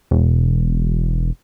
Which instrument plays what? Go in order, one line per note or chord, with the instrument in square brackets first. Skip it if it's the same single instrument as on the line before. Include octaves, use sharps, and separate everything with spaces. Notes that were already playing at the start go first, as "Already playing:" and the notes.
[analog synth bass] E1